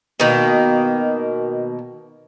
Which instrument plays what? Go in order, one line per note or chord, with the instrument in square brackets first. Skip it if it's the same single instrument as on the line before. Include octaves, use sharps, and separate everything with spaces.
[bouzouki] B2 D#3 A#3